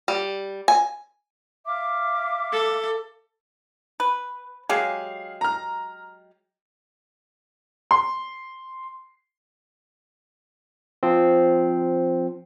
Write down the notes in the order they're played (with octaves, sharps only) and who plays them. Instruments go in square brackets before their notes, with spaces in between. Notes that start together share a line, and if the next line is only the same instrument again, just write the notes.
[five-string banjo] G3
G#5
[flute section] E5 F5 D6
[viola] A4
[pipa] B4
[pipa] F#3 G#3 G4 [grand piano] G#4 F5
[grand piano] A#5 F6
C6
[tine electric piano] F3 C4